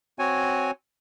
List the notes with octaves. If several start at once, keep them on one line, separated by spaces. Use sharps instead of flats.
C4 F#4 C#5 G#5